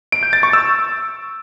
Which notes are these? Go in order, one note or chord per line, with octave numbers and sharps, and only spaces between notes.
D7
G6
A6
C#6
E6